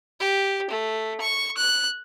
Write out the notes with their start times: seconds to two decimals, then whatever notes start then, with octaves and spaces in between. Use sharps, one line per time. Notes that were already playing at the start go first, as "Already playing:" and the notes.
0.20 G4
0.70 A3
1.21 C#6
1.58 F#6